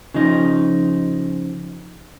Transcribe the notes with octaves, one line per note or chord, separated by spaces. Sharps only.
C#3 F3 D#4